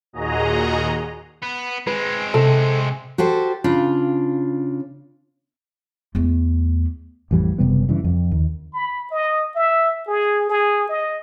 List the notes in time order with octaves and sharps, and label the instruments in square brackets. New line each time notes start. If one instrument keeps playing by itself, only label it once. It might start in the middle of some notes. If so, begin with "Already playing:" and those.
[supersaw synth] D#2 A#2 F#4 G#4 D#5 A#5
[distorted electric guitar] B3
[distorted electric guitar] G#3 C4 [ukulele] B4
[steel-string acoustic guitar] C3 [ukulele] A4
[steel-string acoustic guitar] F#4 G4 A4 C5
C#3 D4 F4
[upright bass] E2 A3
[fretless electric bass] A1 F2 E3 G3
F#1 C3 G3 B3
G2 C#3 E3
F2
D#2
[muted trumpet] B5
D#5
E5
G#4
G#4
D#5